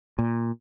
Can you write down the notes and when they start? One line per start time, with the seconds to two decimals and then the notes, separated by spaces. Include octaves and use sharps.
0.19 A#2